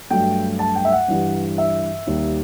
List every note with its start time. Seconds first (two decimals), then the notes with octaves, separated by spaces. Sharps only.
0.10 G2 F#3 A3 G5
0.59 A5
0.75 G5
0.85 E5
0.92 F#5
1.08 G2 E3 G3
1.58 E5
2.07 D#2 D#3 G3